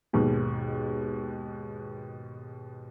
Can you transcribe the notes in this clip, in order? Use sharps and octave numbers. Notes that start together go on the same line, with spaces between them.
D#2 G#2 B2